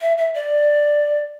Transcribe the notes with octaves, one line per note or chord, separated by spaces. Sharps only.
E5
E5
D5